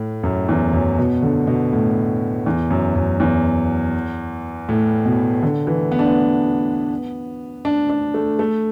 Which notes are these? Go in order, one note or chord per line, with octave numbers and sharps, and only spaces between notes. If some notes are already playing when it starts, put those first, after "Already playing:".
Already playing: A2
F#2
E2
F#2
B2
D3
B2
A2
E2
F#2
F#2
E2
A2
B2
D3
E3
B3
D4
B3
D4
D4
A3
A3